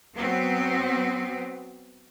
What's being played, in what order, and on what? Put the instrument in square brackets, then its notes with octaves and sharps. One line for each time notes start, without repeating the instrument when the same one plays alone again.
[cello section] F#3 B3 C4